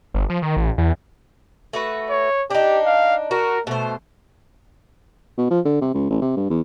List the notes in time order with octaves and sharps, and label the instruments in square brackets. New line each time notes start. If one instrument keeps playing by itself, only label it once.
[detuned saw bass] G1
F3
D#3
A1
E2
[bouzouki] A3 F#4 B4
[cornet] C#5
[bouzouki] D4 D#4 [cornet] G4
[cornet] F5
[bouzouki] F#4 [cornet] A#4
[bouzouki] B2 C5 [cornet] A3
[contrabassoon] B2
F3
D3
C3
C#2
A1
C3
G2
E2